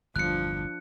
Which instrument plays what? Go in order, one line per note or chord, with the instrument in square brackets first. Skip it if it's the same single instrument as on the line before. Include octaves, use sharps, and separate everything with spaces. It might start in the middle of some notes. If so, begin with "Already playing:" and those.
[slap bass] G1 E2 [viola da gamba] F3 D4 [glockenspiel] F#6 C#7